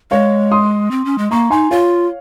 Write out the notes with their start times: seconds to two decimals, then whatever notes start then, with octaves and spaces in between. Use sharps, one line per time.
0.11 G#3 C#5 F5
0.52 C6 D#6
0.91 C4
1.05 C#4
1.18 G#3
1.31 A#3 A#5 C#6
1.50 D#4 G#5 C6
1.71 F4 C#5 F5